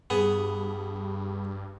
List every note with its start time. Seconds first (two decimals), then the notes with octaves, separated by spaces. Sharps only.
0.10 G2 B3 G#4